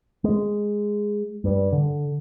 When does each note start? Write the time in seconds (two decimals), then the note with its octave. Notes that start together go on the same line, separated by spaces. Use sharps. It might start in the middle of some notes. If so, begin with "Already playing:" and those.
0.24 G#3
1.44 G2
1.72 D3